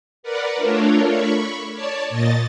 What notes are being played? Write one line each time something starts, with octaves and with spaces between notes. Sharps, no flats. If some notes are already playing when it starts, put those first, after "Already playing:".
A#4 B4 D5 F#5
A3 D4 F4 A4 A#4 C#5
B5 C#6
C#5 D5 A5
A#2 D#5 A6